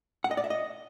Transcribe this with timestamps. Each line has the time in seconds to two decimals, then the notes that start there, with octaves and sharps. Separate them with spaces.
0.24 F#5
0.31 D#5
0.37 D5
0.44 E5
0.50 D#5